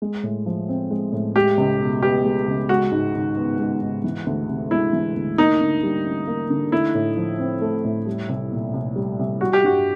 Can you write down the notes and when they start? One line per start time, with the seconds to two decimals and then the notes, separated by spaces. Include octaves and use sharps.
0.02 G#3
0.23 A2
0.46 F3
0.69 C4
0.91 G#3
1.13 A2
1.36 G#3 G4
1.57 C#2
1.80 B2
2.02 B3 G4
2.25 G#3
2.47 C#2
2.69 G#3 F#4
2.92 G#2
3.14 D#3
3.37 B3
3.59 G#3
3.82 G#2
4.04 E3
4.26 D2
4.49 C3
4.71 G#3 E4
4.93 E3
5.16 D2
5.38 A#3 D#4
5.60 D3
5.83 G3
6.06 C#4
6.27 A#3
6.50 D3
6.72 A3 E4
6.95 A2
7.17 F3
7.39 C4
7.61 A3
7.84 A2
8.06 G3
8.29 C2
8.52 A#2
8.74 C2
8.96 G3
9.19 C2
9.41 G3 F#4
9.53 G4
9.64 G2 F#4